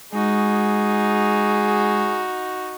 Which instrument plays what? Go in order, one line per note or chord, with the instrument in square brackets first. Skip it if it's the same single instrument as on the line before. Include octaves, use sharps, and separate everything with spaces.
[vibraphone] G#3 [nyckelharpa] D#4 F#4 [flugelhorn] G#4